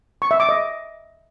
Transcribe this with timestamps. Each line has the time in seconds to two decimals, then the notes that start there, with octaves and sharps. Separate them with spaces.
0.22 C#6
0.31 E5
0.40 D6
0.49 D#5